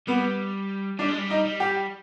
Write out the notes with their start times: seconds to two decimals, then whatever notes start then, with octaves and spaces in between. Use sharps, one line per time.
0.07 G3 B3
0.99 G3 D4
1.08 G#3
1.17 G3
1.30 D#4
1.45 G3
1.60 G4